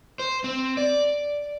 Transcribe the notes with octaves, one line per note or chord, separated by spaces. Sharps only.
C5
C4
D5